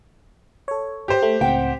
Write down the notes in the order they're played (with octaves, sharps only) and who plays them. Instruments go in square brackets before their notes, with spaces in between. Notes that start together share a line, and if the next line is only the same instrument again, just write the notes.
[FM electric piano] A4 C#5
[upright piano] G4 C5
[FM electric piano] A3
[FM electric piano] C#2 A2 C4 [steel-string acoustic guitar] F#5 G5